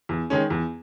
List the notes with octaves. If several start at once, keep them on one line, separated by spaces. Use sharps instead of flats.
E2
D#3 G#3 C#4
E2